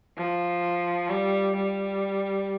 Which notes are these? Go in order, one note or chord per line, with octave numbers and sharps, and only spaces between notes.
F3
G3
G3